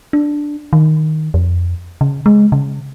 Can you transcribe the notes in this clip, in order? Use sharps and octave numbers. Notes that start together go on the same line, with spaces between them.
D4
D#3
F2
C#3
G#3
C#3